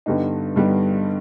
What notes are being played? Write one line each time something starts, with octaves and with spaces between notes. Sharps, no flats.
G2 D3 G3 B3 D#4
G2 D3 G3 B3 D#4